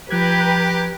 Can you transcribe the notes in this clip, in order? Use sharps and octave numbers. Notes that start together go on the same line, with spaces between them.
F3 G4 B4 G5 A#5 F#6 G#6